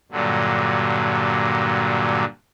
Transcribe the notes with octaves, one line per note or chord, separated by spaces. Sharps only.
G2 A#2 D3 F#3